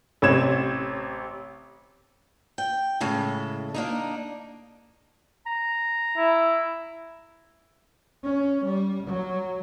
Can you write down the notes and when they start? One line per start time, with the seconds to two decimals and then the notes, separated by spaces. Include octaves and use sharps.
0.22 A1 C3 C#5 G#6 E7
2.58 G5
3.00 A2 C#3 G#3 A4
3.74 A#3 D4 D#4
5.46 A#5
6.17 E4
8.23 C#4
8.65 G3
9.06 F#3